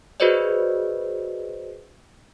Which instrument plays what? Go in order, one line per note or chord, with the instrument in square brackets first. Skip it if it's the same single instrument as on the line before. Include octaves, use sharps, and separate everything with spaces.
[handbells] F#4 G#4 B4 C5 D5 D#5